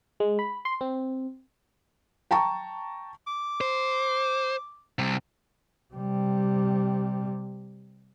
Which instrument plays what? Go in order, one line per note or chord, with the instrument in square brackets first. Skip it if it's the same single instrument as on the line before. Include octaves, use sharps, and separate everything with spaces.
[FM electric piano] G#3
B5
C6
C4
[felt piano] G5 A5 A#5 C#6
[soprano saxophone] D6
[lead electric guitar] C5
C3 G3
[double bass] C3 G3